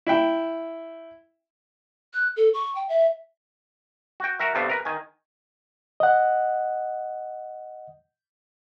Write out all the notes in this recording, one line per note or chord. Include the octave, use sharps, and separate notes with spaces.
E4 E5 G5
F#6
A4
C#6
G5
E5
F#4 G5
F#4 A#4 E5
G2 C3 G3 A3 B3 C4
A#4 B4
D#3 G#5
D#5 F#5